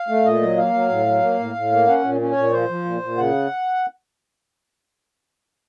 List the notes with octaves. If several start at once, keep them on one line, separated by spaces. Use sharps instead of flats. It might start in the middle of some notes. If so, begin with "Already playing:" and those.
Already playing: F5
A3
A#2 D#5
F#3
A#3 F5
F#3
A2
F#3
A#3
A2
A2
A#3
C#4 F#5
A#2
C#4
C#5
A#2
F3 C5
F3
A#2
A#2
C#3 F#5